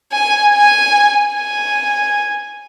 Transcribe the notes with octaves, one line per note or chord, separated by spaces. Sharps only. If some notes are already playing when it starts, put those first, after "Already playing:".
G#5
G#5
G#5